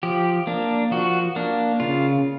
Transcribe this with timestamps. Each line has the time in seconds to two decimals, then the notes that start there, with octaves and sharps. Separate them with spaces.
0.03 F3 G4
0.47 A#3 D4
0.91 F3 F#4
1.36 A#3 D4
1.80 C#3 F4